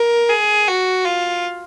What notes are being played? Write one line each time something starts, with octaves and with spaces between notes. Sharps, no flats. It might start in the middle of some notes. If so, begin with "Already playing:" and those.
Already playing: A#4
G#4
F#4
F4